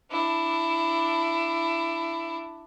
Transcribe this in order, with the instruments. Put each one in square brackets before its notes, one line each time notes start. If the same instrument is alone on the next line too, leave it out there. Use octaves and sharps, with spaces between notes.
[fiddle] D4 E4